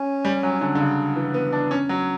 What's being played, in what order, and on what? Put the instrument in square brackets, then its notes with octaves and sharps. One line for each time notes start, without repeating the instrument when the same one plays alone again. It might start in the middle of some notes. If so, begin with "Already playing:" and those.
Already playing: [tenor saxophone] C#4
[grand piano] G3
F#3
D3
D3
C#3
E3
B3
D4
C#4
F#3